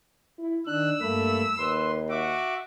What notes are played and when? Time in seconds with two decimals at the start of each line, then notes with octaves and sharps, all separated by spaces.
0.38 E4
0.67 D#3 D4 E6 F#6
1.01 G2 A3 A#3 B5
1.58 D#2 B4 C6
2.10 F#4 E5 D6